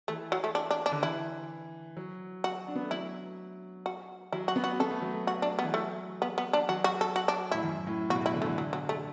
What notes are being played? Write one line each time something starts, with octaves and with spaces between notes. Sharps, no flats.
E3 A3
F#3
A3
D4
D4
D4
D3
E3 E4
F#3
F#4
D4
B3
A3
F#3 E4
F#4
F#3 E4
F#4
B3
F#4
B3 A4
A3
F#3
A3
F#4
D4
B3
E3
F#3 A3
B3
B3
D4
F#3 F#4
F#4
A4
F#4
D4
A2 E4
F#2
A2
B2 F#4
E4
D3
A3
E3
D3 F#3
F#3
A3